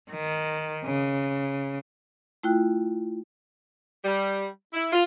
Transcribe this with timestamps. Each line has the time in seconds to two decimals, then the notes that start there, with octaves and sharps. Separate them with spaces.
0.11 D#3
0.85 C#3
2.43 A3 E4 F4 G5 F#6
4.04 G3
4.73 E4
4.93 F4